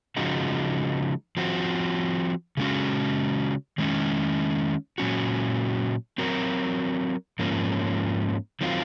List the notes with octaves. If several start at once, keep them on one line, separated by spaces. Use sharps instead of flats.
C#3 F3 G#3 D#4 F#4
F3 C4 F#4
C#3 G#3 C#4 F#4
D#3 G#3 C#4
A#2 F#3 C#4 F#4
F#3 C4 F#4 A#4
G#2 F3 A#3 C#4
D#3 F#3 C4 F4